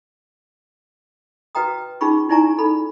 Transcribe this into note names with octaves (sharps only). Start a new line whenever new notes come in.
F#4 B4 D#5 G5 A#5 D#6
C#4 D#4 F4 G#4 B5 C#6
D#4 E4 D5 G#5 A#5 C#6
D#4 A4 B5